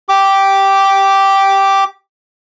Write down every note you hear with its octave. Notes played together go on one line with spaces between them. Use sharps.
G4 D6